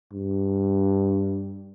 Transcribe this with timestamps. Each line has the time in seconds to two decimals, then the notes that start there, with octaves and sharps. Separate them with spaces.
0.13 G2